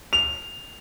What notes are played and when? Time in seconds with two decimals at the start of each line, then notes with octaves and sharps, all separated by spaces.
0.13 F7